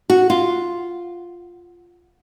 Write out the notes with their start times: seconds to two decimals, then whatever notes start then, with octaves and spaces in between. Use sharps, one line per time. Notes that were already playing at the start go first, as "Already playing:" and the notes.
0.10 F#4
0.30 F4